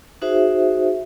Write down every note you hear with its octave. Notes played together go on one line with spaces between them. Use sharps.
D#4 F#4 G#4 C5 E5